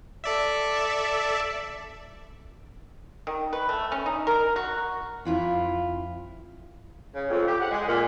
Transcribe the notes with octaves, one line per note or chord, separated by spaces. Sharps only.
A4 D5 E5
D#3
B4
A3
C#4
D#4
A#4
F#4
F2 E4 F4
C#3
F2
G4
F#5
G#3
A#2